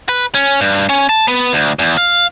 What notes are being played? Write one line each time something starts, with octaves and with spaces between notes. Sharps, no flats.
B4
C#4
G2
C#4
A5
B3
D2
E2
F5